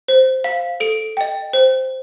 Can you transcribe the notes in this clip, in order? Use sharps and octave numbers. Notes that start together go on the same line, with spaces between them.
C5
F5
A4 D7
D#5 G5
C5